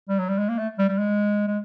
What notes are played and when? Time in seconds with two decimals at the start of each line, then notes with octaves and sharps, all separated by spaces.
0.09 G3
0.19 F#3
0.29 G3
0.38 G#3
0.49 A#3
0.59 A3
0.79 G3
0.89 G3
0.98 G#3
1.48 G#3